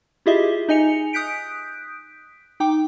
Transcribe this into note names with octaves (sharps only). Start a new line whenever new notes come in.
E4 F4 G4 G#4 D#5 E5
D#4 D#5 G#5 C#7 F7
D#6 F#6 G6 B6 D7
D#4 G5 D6